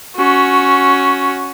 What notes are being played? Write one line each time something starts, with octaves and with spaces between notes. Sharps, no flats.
C#4 F#4